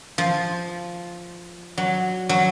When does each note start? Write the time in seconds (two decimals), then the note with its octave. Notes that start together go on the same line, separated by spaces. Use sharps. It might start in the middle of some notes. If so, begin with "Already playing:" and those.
0.18 F3
1.78 F#3
2.29 F#3